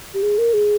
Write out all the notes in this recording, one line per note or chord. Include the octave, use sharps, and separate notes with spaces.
G4
G#4
A#4
G#4